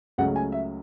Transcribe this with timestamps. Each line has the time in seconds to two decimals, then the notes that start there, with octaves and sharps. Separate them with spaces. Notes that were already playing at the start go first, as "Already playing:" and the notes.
0.18 C#2 C#3 F#3 A3 F#5
0.36 G#5
0.52 E5